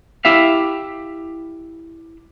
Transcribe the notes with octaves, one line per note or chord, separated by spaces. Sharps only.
E4 G4 E5 F5